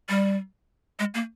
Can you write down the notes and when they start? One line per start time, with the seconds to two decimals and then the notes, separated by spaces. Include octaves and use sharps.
0.09 G3
0.99 G#3
1.14 A#3